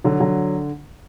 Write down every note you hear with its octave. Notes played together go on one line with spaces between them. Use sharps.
D3 F#3
D3 F#3